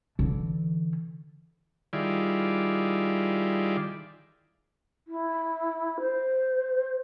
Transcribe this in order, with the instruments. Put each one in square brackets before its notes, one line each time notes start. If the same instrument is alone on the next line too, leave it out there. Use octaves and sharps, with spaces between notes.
[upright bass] D3 E3
[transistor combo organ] D#3 G3 E4 F4 G#4 D5
[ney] E4
C5